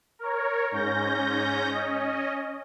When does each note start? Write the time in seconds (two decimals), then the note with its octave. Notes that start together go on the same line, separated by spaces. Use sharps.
0.19 A#4 C#5
0.71 G#2 C#4 G6 A#6
1.71 C#4 D#5